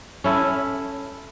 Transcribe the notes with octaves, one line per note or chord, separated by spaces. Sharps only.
C#4 E4 A4